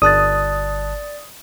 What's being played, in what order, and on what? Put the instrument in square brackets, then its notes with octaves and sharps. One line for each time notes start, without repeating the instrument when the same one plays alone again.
[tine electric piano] G1 A5 F#6 [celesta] D5 A6 [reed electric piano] D#6